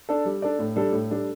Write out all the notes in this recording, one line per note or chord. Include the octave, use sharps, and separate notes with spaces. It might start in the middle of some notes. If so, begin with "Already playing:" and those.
D4 A4 D5
G3
D4 A4 D5
A2
G3 D4 A4
A2
G3 D4 A4